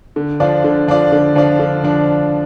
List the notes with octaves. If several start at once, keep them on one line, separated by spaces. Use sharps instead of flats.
D3
F3 D4 F4 D5
D3
F3 D4 F4 D5
D3
F3 D4 F4 D5
D3
F3 D4